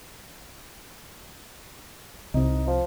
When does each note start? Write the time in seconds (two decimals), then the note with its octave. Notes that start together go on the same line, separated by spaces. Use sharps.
2.34 C2 C3 D#4
2.67 F3